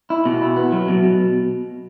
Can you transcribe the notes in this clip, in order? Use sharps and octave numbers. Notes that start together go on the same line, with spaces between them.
E4
B2
E4
B3
F#3
B2
B2